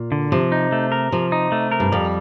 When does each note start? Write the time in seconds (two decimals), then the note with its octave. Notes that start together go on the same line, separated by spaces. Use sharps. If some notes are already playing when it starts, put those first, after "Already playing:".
Already playing: A#2
0.12 D3
0.32 C3 F3
0.52 D#4
0.72 A3
0.92 A#4
1.12 C3 F3
1.32 D#4
1.52 A3
1.72 A#4
1.80 G2
1.92 F2 G3